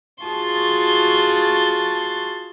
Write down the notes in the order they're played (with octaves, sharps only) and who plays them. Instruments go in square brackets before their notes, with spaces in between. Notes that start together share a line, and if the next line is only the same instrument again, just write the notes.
[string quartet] F4 F#4 G#4 A5 C6 C#6